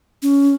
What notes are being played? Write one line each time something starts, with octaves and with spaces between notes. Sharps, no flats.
C#4